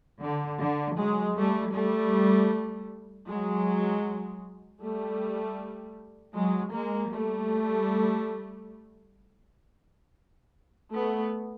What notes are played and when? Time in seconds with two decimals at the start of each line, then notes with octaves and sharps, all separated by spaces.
0.21 D3
0.60 D3
0.98 F#3 G#3
1.37 G3 A3
1.75 G3 A3
3.28 F#3 G#3
4.81 G3 A3
6.35 F#3 G#3
6.72 G#3 A#3
7.11 G3 A3
10.94 A3 B3